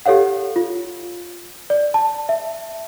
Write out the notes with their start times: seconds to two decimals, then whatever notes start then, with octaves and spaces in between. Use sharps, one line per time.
0.06 G4 A4 C#5 F5 F#5
0.56 F4
1.70 D5
1.94 A5
2.29 E5